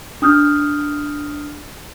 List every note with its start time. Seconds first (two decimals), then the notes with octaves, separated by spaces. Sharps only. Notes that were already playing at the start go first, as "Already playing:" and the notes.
0.22 D4 D#6 F6 G6